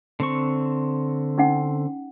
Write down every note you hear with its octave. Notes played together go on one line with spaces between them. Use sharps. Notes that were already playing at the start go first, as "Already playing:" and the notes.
D3 C4 C#6
C#4 D#4 F#5